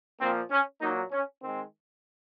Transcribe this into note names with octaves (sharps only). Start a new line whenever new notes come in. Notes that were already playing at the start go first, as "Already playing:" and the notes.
A#2 F3 A#3 C4
C#4
A#2 F#3 A#3 D#4
C#4
D#3 G#3 C4